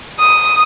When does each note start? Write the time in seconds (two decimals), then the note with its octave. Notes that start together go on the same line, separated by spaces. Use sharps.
0.19 D#6